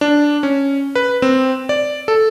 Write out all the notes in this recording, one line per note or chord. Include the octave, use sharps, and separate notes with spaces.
D4
C#4
B4
C4
D5
A4